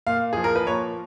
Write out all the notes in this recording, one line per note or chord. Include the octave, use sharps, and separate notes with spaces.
A#2 F5
F3 G#4
A#4
B4
A#2 C#5